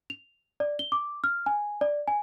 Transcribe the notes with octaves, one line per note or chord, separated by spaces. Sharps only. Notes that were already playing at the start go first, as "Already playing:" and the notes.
F7
D5
G7
D6
F6
G#5
D5
G#5